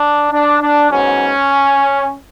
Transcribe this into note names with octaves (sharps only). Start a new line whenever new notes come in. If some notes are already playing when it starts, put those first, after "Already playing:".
Already playing: D4
D4
D4
G#2 F#3 B3 C#4